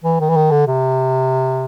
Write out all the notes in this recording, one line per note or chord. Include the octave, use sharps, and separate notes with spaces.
E3
D#3
E3
D#3
D3
C3